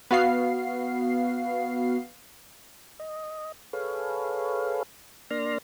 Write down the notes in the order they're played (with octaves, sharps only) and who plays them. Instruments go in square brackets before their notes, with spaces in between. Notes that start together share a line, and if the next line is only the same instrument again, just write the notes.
[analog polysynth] B3 F#4 F5 C7
[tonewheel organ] D#5
G#4 A4 B4 C#5 F5
A#3 D4 D5 C6 F6 A#6